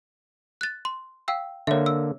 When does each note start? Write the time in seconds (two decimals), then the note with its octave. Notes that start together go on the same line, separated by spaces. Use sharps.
0.61 F#6 A6
0.85 C6
1.28 F5 G5 E6
1.67 D3 A#3 C#5 E5
1.86 E6